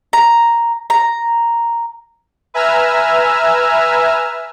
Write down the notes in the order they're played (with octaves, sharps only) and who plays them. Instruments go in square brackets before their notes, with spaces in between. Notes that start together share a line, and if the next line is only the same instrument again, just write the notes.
[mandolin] A#5
A#5
[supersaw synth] B4 E5 G#5 A#5 E6 F6